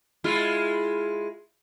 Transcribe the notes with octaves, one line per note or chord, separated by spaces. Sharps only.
G#3 E4 F4